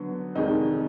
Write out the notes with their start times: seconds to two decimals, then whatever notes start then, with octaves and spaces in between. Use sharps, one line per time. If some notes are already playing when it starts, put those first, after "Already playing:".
Already playing: D3 F#3 B3
0.35 F1 F2 D#3 G#3 D#4